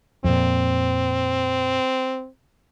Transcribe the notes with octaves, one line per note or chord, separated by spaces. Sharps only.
F2 A#2 C4